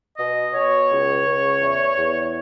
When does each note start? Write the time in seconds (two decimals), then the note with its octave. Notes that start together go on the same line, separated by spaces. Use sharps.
0.18 B2 D#5
0.53 B2 C#5
0.90 C#2
1.25 C#2
1.61 E2
1.97 E2